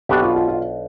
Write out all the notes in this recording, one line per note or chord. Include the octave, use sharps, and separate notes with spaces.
B1 B2 B3 D4 G4
F4
F4
F4